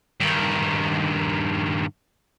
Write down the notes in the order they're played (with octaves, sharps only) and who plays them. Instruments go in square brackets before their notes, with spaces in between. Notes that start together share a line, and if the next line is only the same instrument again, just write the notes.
[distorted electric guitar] G2 D#3